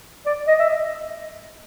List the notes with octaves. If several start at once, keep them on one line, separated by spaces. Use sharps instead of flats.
D5
D#5
E5
D#5